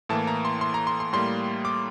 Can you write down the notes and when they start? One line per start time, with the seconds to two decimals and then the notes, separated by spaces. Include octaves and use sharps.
0.09 A2 E3 A#3 A5
0.27 A#5
0.45 C6
0.61 C6
0.74 A#5
0.87 C6
1.00 C6
1.13 A2 G3 A#3 C6
1.65 D6